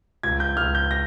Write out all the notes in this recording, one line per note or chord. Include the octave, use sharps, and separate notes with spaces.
C#2 G#6
G6
C#2 F6
G6
A#6